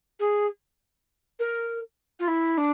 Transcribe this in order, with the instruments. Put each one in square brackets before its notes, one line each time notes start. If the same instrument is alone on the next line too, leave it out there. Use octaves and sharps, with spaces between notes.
[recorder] G#4
A#4
F4
E4
D4